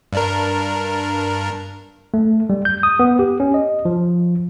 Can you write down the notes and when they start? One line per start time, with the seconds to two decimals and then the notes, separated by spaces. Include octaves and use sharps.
0.13 G2 D4 A#4
2.14 A3
2.50 G3
2.65 G6
2.83 D#6
2.99 B3
3.19 G4
3.40 C#4
3.54 D#5
3.85 F3